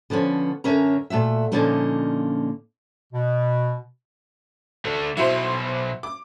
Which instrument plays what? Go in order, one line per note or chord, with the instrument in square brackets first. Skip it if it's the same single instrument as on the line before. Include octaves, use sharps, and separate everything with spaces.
[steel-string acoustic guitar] D3 F3 B3 C#4
F#2 D3 C#4 A#4 E5 A#5
A#2 A3 F#4 E5
A#2 D3 F3 A#3 C#4 D#4
[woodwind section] B2
[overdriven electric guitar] D3 A3
[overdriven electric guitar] B2 F#3 [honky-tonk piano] E4 F#4 C5
[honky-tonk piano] D6